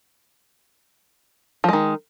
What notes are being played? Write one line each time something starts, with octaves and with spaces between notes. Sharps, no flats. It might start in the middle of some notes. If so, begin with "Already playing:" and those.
D#3 F3 G#3